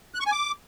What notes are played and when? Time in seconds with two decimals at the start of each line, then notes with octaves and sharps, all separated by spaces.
0.14 F#6
0.20 C#6
0.26 G#5
0.32 D6